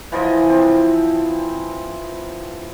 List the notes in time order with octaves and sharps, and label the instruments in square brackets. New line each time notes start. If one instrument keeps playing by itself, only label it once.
[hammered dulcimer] E3 F3 F4 D#5
C4